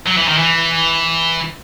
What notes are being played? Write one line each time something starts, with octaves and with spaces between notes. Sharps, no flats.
F#3
E3
D#3
E3